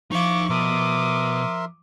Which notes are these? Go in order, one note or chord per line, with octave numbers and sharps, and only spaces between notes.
F3 D#4 E4 F5 C#6 D6
B2 A#4 E5 C6 D6 D#6